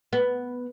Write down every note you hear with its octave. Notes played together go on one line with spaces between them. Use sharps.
B3